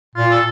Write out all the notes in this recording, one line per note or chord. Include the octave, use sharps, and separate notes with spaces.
A#2 F4
A4